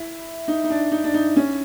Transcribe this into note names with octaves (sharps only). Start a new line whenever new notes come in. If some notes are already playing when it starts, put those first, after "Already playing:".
Already playing: E4
D#4
D#4
D4
D#4
D4
D#4
C#4